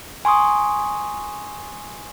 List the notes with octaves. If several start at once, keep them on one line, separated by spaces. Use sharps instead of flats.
G#5 C6 C#6 D#6